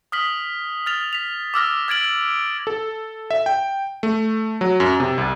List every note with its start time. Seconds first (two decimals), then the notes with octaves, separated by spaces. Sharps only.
0.12 D#6 F6 B6 F#7
0.86 F6 A6 F7
1.13 B6 F7
1.54 D6 E6 F6 A#6
1.88 F6 G#6 A6 D7 F#7
2.67 A4
3.31 E5
3.46 G5
4.03 A3
4.61 F#3
4.80 F#2
5.00 C3
5.18 C2